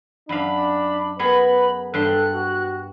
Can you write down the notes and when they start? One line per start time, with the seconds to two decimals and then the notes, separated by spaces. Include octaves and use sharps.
0.29 F#2 D4 F5 B5
1.19 B3 G#4 A#4 B4 B5
1.94 G2 G3 A4 C6 F#6
2.33 F#4